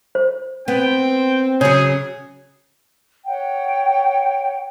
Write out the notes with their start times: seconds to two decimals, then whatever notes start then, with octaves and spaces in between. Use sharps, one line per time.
0.15 C5
0.68 B3 C4 G5
1.61 C#3 F#3 G#4 C#5
3.25 C#5 F#5 G5